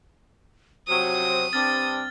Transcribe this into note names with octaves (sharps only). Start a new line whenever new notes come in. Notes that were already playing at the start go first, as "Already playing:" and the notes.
C3 F3 F#3 C5 D#6
G2 G3 C4 D4 F6 A6